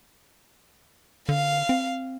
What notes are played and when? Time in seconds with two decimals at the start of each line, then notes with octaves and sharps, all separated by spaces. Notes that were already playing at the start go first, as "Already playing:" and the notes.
1.29 D3 F5
1.69 C4